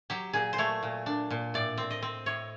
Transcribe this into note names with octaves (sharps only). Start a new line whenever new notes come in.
F#3 G4
A#2 G#4
C5
A3 C#5
A#2
D4
A#2
A2 D5
C4
D#5
C4
A2 C#5